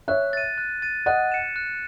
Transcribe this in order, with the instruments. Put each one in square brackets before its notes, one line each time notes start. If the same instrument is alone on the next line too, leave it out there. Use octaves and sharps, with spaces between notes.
[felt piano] C#5 E5 [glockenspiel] F#6
[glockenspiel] A6 D#7
F#6
A6 D#7
[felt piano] D#5 F#5 [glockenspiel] F#6
[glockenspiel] C#7 E7
F#6